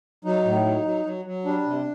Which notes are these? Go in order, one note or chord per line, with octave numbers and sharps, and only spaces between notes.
F#3 D#4
A2
F#3
F#3
F#3
F#3
G3 D4
C3